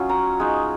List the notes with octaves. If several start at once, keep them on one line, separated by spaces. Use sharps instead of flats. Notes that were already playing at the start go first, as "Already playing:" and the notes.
Already playing: F#3 C#4 D#4 F4
A#5
G#3 D#4